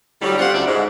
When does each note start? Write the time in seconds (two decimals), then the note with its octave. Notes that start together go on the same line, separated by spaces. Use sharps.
0.22 A2 D3 F#3 G3
0.38 C4 F4 F#5
0.54 D2 C#3 G3 D5 E5 F#5
0.67 G#2